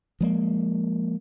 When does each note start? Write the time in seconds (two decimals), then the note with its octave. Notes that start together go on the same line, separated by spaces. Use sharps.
0.21 F3 G#3 A#3